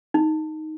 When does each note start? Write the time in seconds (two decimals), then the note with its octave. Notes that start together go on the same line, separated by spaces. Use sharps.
0.14 D#4